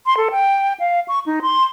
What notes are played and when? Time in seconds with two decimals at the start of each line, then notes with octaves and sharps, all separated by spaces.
0.06 C6
0.17 A4
0.31 G5
0.79 F5
1.08 C#6
1.26 D#4
1.42 C6